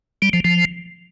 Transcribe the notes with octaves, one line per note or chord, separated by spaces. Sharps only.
G3
F3
F3